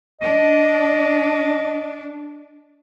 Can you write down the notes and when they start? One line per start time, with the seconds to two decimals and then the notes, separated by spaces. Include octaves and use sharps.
0.21 D4 D#5